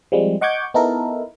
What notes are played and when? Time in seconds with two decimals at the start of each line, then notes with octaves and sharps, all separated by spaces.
0.12 F3 G3 G#3 C4
0.41 D#5 F#5 C#6 D6 G6 G#6
0.74 B3 D#4 E4 A4 A#4